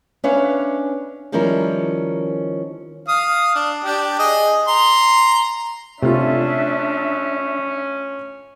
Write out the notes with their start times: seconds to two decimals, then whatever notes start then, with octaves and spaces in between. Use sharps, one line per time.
0.24 C#4 D4 B4 C#5 E5 F5
1.32 D#3 F3 G3 C#4 E4 A#4
3.08 F5 D#6
3.55 D4
3.84 D4 G4
4.19 G#4 D#5
4.68 A#5 C6
6.03 C3 A3 C#4 D4 F4 E5